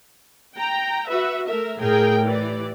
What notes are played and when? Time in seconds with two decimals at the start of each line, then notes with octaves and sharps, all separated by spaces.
0.57 G5 A#5
1.08 F#4 B4 E5
1.48 A3 A#4 E5
1.78 A2 G#4 A#4 G5
2.25 E3 G4 D5